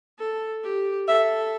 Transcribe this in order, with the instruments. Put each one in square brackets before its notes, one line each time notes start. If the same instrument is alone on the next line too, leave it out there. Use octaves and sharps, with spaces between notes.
[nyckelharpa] A4
G4
[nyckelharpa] A4 [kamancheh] E5